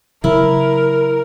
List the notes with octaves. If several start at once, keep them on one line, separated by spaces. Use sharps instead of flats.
C#3 F#3 E4 A#4